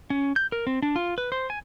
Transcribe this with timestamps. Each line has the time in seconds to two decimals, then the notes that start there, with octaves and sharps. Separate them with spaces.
0.10 C#4
0.36 G6
0.52 A#4
0.67 C4
0.82 D4
0.96 F4
1.18 B4
1.32 C5
1.50 G#5